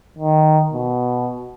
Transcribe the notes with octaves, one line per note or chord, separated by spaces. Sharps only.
D#3
B2